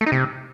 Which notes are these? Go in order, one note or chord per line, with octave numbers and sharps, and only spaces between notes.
A3
D#4
C3